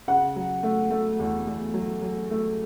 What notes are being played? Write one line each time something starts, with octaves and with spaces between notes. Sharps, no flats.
C#3 F#5
F#3
A3
A3
E2
E2
F#3
F#3
A3